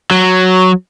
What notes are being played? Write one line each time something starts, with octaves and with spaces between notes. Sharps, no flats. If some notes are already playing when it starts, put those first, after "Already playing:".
F#3